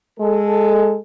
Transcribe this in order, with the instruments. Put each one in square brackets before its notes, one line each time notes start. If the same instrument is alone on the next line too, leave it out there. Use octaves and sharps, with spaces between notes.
[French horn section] G#3 A4